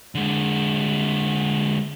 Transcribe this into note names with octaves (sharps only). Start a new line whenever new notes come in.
D3 G#3